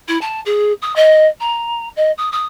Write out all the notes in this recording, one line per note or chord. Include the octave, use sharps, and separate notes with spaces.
E4
A5
G#4
D#6
D#5
A#5
D#5
D#6
D#6